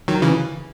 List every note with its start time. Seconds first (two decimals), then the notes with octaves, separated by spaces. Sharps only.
0.08 D#3 F#3
0.22 C#3 E3